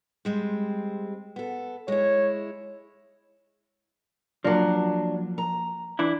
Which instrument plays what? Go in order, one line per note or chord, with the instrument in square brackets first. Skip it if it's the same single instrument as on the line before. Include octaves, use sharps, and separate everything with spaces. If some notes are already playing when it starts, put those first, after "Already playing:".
[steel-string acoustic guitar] G3 G#3 C4
B3 A4
[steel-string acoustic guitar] G#3 E4 [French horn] C#5
[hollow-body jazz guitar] F3 A#3 [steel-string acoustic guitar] F#3 D4
[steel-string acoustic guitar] A#5
[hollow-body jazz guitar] E3 D4 E4